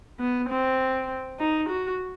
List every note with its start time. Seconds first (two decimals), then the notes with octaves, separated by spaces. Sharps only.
0.20 B3
0.49 C4
1.39 D#4
1.69 F#4